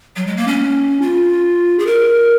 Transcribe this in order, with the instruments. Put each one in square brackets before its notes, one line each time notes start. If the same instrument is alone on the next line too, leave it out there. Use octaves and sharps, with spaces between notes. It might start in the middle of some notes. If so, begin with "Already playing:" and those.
[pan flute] F#3
G#3
A#3
C#4
F4
G#4
A#4